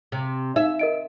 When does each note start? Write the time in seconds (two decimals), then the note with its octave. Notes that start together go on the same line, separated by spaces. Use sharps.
0.12 C3
0.56 D#4 E5
0.79 A#4 D#5 D7